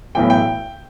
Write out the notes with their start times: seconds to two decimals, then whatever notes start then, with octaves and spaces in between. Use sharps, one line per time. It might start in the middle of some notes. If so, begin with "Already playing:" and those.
0.15 B1 A2 E3 G5
0.30 G5